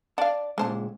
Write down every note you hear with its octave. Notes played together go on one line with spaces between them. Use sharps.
D5 F5 F#5 A5
A#2 C#3 G#3 C5 A5